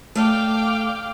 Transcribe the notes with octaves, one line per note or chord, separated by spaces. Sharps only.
A3 D5 F5 G5 A5 D6